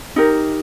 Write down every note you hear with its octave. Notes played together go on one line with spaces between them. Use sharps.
D#4 G4 A#4